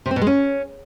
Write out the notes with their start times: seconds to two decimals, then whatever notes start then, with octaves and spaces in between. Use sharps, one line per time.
0.06 C3
0.11 C4
0.16 B2
0.21 G#3
0.27 C#4